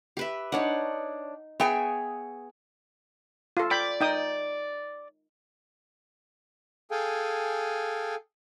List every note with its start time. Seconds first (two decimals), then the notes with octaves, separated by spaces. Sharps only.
0.17 G4 B4 E5
0.52 D4 D#4 C#5 F#5
1.60 B3 G#4 C#5 E5 G5 G#5
3.57 F4 A4
3.71 D5 G5 B5
4.01 D#4 G5 D#6
6.91 G#4 A4 F5 G5 G#5